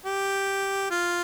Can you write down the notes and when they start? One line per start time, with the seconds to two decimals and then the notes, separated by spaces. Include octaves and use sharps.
0.06 G4
0.91 F4